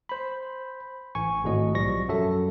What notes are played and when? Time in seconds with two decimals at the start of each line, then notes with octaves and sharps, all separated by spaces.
0.09 C5 B5
1.15 A1 G#5 C#6
1.44 G#1 A2 F#4 D#5
1.74 B1 F3 G3 C#6 A#6
2.08 F#2 F#3 A4 E5